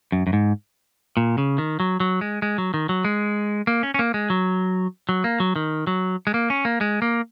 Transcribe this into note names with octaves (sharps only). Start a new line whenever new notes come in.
F#2
F#2
G#2
A#2
C#3
D#3
F#3
F#3
G#3
G#3
F#3
D#3
F#3
G#3
A#3
C#4
C#4
A#3
G#3
F#3
F#3
A#3
F#3
D#3
F#3
G#3
A#3
C#4
A#3
G#3
A#3